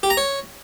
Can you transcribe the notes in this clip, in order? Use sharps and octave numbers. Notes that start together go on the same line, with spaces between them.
G4
A#5
C#5